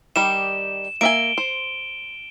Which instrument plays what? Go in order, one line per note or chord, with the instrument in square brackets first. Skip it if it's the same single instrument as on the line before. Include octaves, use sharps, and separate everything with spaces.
[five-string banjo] D#3 G3 G4 [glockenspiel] E7
[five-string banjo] A#3 E5 G#5 [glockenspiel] D7 G7
[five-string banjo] C5